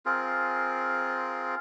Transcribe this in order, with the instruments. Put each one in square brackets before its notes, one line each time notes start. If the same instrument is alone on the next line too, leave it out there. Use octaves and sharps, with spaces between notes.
[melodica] C4 F4 G#4 A#4